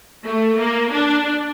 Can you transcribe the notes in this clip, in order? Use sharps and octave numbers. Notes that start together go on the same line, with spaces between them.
A3
A#3
D4